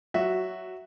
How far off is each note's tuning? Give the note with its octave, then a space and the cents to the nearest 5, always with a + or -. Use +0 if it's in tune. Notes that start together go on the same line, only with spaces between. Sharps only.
F#3 +10 F#4 +0 E5 +0